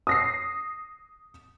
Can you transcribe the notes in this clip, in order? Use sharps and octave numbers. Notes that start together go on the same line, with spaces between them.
D#6 A#6 C7